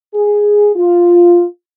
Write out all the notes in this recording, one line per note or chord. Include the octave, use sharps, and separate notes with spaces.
G#4
F4